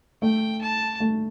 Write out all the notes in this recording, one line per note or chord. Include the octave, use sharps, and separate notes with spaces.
A3 G5
A5
A3